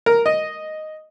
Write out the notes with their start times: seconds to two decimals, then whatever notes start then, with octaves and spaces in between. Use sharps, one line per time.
0.06 A#4
0.26 D#5